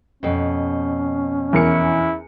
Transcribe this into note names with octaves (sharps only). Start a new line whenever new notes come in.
F2 B2 C#4
E2 E4 A#4 C#7